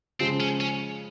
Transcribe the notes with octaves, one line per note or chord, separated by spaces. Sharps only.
C#3 F3 G#3 C4
C#4
C#4